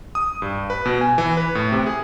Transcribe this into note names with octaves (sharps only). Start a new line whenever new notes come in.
D#6
G2
B4
B2
G#5
E3
B4
A2
C3
G#4